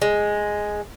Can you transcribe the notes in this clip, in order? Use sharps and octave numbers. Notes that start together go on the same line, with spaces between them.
G#3